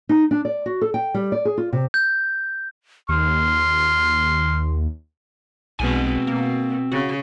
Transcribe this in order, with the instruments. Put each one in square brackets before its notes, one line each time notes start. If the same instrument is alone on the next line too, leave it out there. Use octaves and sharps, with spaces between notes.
[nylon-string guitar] D#4
D4
D5
F#4
A4
G5
G3
D5
G#4
F4
C3
[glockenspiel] G6
[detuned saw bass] D#2 [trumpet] C6 [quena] F6
[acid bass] B1 [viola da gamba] B2 G#3 [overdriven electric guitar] C4 G#5
[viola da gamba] B2 [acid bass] A#3
[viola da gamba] C#3 [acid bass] F#4